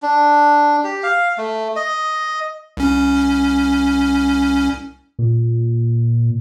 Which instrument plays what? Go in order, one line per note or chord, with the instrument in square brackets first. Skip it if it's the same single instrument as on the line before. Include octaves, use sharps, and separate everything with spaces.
[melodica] D4
G4
F5
A3
D#5
[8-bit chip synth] C2 C#4
[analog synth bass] A#2